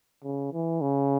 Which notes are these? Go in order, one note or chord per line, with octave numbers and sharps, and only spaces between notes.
C#3
E3
C#3